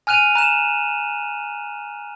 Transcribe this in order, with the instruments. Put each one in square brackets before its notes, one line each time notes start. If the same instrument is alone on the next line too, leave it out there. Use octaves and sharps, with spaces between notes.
[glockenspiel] G#5 F6 F#6 D#7 F7
A#5 F#6 E7